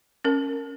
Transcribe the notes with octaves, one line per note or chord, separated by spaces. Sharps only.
C#4 A#4